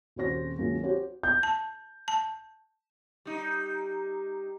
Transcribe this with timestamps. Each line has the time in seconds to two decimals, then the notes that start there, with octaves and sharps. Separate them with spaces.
0.16 D#1 C#3 C4 F#4 C5 A#6
0.58 C#2 D#3 F#3 A#3
0.83 F#4 G4 C5 C#5
1.23 G6
1.43 A5
2.08 A5
3.25 G3 D#4